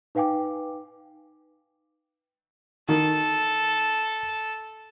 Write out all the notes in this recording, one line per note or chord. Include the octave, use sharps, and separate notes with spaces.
D#4 B4 F5 G5 G#5 D6
D#3 A4